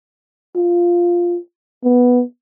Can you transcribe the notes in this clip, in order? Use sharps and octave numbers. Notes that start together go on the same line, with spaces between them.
F4
B3